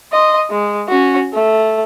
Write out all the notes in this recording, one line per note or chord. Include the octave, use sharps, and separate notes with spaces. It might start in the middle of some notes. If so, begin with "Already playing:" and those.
D#5 C6
G#3
C#4 F#4
A3